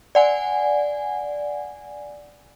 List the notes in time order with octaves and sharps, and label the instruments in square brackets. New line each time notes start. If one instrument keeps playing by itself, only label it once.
[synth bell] D5 F#5 G#5